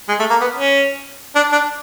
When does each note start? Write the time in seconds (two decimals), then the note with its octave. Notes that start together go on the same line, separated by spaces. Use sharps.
0.09 G#3
0.19 A3
0.30 A#3
0.41 B3
0.56 C#4
1.36 D4
1.52 D4